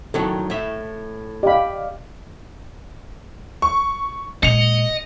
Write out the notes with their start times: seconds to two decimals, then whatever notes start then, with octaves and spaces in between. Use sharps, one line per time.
0.14 A2 D#3 F#3 A4
0.50 A2 E5
1.43 G4 D5 D#5 F5 B5
3.62 C#6
4.43 A#2 G#3 D#5 C#7 F7